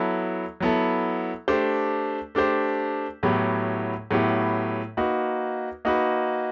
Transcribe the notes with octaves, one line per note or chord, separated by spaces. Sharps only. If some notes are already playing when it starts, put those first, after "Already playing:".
Already playing: F#3 B3 E4 A4
F#3 B3 E4 A4
A3 D4 G4 C5
A3 D4 G4 C5
A2 F#3 B3 E4 G4
A2 F#3 B3 E4 G4
A#3 D#4 F#4 B4
A#3 D#4 F#4 B4